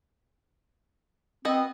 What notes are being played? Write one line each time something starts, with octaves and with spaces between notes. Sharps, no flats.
B3 C4 F#4 D#5